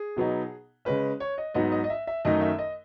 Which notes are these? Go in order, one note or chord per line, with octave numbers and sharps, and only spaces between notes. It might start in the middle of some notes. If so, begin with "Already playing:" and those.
Already playing: G#4
B2 F#3 B3 D#4
C#3 G#3 C#4 B4
C#5
D#5
G#2 F#3 B3 D#4 D#5
D#5
D#5
E5
E5
F#2 D#3 A3 D#4 D#5
E5
D#5